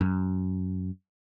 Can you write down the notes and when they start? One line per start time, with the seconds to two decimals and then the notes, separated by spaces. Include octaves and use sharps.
0.01 F#2